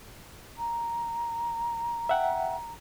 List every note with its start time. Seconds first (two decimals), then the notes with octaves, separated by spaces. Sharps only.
0.58 A#5
2.09 E5 F#5 G5